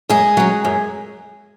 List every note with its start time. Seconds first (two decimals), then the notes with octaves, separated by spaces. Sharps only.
0.09 F#2 G#3 G#4
0.37 F#3 C#4
0.65 F#2